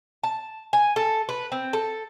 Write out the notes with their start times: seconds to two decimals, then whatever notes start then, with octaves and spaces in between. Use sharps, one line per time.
0.24 A5
0.73 G#5
0.96 A4
1.29 B4
1.52 C4
1.73 A4